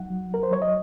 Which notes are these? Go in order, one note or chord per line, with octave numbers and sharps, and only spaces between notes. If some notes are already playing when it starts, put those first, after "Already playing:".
Already playing: F#3 D#4 F#5
F#3
A#4
C5
F#3 C#5
D#5